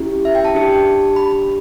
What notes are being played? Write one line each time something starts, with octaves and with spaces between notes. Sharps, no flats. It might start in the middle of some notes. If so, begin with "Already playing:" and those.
Already playing: C#4 E4 G4
E5
G5
A5
D4 G4
B5